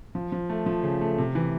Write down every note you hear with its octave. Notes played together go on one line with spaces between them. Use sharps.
F3
F3
A3
F3
C#3
A3
C3
E3